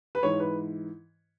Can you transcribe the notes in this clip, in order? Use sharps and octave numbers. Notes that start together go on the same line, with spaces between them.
B4
G#2 E3 C#5
B4